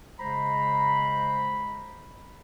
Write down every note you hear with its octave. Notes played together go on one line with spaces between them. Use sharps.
C#3 G#3 C5 A#5 B5